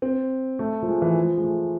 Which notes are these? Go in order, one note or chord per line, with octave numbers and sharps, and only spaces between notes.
C4
A3
F3
G#3
E3
F3
G#3
A3